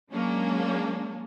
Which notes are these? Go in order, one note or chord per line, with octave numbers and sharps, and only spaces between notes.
F#3 G#3 A#3 C#4 D4